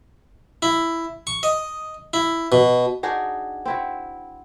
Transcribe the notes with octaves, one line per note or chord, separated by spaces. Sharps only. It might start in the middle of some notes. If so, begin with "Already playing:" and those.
E4
C#6
D#5
E4
B2
D4 D#4 F#4 G#4
C4 E4 F#4